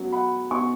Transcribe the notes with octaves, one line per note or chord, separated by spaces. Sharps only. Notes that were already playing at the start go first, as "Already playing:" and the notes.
Already playing: F#2 F#3 B3
F#5 B5
B2 B3 D#4 G#5 C#6